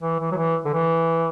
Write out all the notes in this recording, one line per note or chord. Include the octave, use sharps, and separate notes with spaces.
E3
E3
F#3
E3
D3
E3